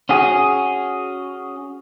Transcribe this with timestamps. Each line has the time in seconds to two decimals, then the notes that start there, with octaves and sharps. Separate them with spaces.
0.09 C#4 F#4 G#4